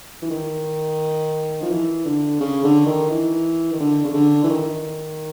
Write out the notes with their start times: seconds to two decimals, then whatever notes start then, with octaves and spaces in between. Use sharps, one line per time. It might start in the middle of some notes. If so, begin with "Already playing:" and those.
0.22 E3
0.31 D#3
1.62 F3
1.70 E3
2.05 D3
2.40 C#3
2.64 D3
2.86 D#3
3.10 E3
3.72 D#3
3.80 D3
4.04 C#3
4.14 D3
4.44 E3
4.50 D#3